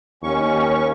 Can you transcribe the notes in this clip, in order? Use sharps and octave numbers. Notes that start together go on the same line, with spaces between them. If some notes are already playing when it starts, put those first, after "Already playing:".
D#2 C#4 C#6